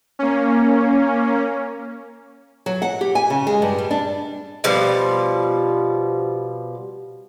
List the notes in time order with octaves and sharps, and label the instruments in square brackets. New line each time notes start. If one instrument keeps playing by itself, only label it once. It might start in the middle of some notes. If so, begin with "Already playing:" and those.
[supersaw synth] A#3 C#4
[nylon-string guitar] F#3
F#5
G4
G#5
C#3
G#3
G2
G3
D4
[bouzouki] B2 F3 G3